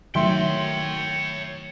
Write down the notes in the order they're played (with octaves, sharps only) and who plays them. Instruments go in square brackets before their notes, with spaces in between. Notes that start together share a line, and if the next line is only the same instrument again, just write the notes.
[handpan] D#3 F#3 A3 [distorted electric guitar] C#5 G5 [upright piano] E5 C6